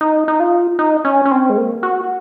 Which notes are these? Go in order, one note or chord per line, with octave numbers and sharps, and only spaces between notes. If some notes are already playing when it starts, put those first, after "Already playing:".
D#4
D#4
F4
D#4
C#4
C#4
C4
G#3
A#3
F#4